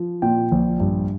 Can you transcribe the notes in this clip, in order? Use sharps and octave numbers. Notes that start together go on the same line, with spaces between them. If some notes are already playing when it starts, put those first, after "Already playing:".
Already playing: F3
A#2 G5
A#1
G2